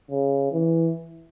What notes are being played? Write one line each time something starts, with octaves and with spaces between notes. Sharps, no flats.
C#3
E3